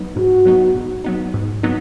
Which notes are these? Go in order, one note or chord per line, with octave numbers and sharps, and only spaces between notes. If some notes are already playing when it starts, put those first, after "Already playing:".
Already playing: F#3 B3 D#4
G#2 F#4
F#3 B3 D#4
G#2
F#3 B3 D#4
G#2
F#3 B3 D#4